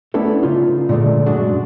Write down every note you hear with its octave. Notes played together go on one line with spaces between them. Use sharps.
A3 B3 C#4 D4 E4 A4
C#3 D#4 F4
A#2 D3 E3 G#3 A3
F#2 G#3 D4 F#4